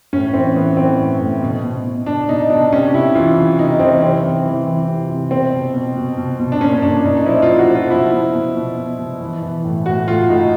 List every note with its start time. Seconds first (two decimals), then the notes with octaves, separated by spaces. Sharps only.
0.13 A2 C#4
0.34 E3 C4
0.55 E3 B3
0.77 E3 C4
0.99 A2
1.20 A2
1.42 B2
1.64 B2
1.85 B2
2.06 B2 D4
2.29 B2 D#4
2.50 B2 D4
2.72 C3 C#4
2.93 C3 E4
3.15 E3 F4
3.37 C3
3.59 C3 D#4
3.79 E3 C4
4.02 C3 C4
4.23 E3
4.45 E3
4.66 E3
4.88 C3
5.10 C3
5.31 B2 C4
5.54 B2
5.74 B2
5.97 B2
6.17 B2
6.39 B2
6.52 D4
6.61 A#2 C#4
6.82 A#2 D4
7.05 A#2 D#4
7.17 D#4
7.26 F3 E4
7.42 F4
7.48 F3
7.59 F#4
7.69 F3
7.75 F4
7.90 B2 E4
8.13 B2
8.35 B2
8.55 B2
8.77 B2
8.99 B2
9.21 E3
9.43 E3
9.65 A2
9.86 A2 F#4
10.07 A2 F4
10.29 A2 D#4